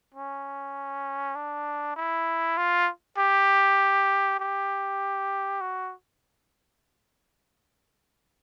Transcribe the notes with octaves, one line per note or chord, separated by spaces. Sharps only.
C#4
D4
E4
F4
G4
G4
F#4